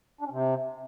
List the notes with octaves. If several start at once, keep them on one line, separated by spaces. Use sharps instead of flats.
D4
C#4
C3